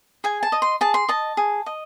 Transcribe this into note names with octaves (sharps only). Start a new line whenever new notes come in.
G#4 G#5
A5
D#5
C6
G#4 A5
C6
D#5 A5
G#4
D#5